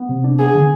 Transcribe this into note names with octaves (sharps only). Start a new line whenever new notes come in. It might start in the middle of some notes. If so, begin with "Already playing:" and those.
Already playing: B3
C3
D4
B3 G#4
D3